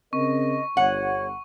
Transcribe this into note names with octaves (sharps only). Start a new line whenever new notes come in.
C#3 C4 A#4 D#5 C#6
G1 C#5 F#5